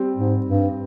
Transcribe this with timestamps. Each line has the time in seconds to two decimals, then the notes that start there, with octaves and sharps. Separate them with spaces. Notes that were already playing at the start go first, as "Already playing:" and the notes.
Already playing: G3 C4 G4
0.16 G#2
0.46 G2